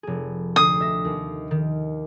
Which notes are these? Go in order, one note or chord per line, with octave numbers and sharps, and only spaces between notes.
F1 G#4
D2 D#6 C7
E5 A#6
D#2
D#3